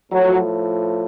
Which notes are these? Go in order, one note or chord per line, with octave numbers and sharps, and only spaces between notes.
A2 F3 F#3